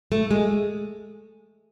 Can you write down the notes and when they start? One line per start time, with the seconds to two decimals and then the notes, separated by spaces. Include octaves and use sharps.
0.12 A3
0.31 G#3